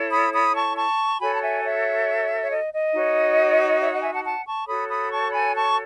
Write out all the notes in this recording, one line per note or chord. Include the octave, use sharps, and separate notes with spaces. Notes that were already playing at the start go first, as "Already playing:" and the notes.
Already playing: E4 A4 C#5
B5 D#6
B5 D#6
A5 C#6
A5 C#6
F#4 A4 C#5 G#5 B5
A5
E5 G#5
C#5 E5
C#5
D#5
D#5
D#4 F#4 C#5
C#5 E5
D#5 F#5
E5 G#5
F#5 A5
F#5 A5
A5 C#6
F#4 A4 C#5 B5 D#6
B5 D#6
A5 C#6
G#5 B5
A5 C#6